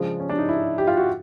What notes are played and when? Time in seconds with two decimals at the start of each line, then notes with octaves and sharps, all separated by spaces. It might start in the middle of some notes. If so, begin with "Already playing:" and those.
Already playing: C#3 F3 G#3 D4
0.20 C#4
0.29 D4
0.38 D#4
0.49 E4
0.78 G4
0.87 F4
0.97 F#4